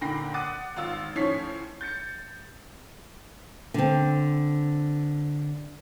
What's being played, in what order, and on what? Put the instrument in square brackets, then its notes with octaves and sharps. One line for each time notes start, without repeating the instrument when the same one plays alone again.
[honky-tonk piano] A#2 D3 G5 B5 A#6 C7
F#5 D6 D#6 F#6 A6 D#7
G#1 F4 E6
A2 F3 C#4 C#5 B6 C7
G6 A6 C#7
[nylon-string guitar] D3 C4